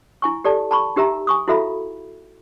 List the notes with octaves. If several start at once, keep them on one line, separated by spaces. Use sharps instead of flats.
E4 G#5 C#6
G4 A4 D5 A5
A5 B5 C#6
D#4 G4 A#4 E5 A#5
G#5 C#6 D#6
E4 F#4 A4 E5 F5 B5